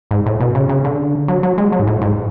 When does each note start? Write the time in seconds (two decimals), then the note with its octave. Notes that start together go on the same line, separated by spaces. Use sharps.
0.11 G#2
0.26 A2
0.40 B2
0.55 C#3
0.69 C#3
0.84 D3
1.28 F#3
1.43 F#3
1.58 G#3
1.72 F#3
1.79 G#2
1.87 A2
2.02 G#2